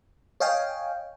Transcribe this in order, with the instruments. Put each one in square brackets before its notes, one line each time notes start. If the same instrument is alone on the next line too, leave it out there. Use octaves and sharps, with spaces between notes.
[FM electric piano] C#5 D#5 F5 G5 G#5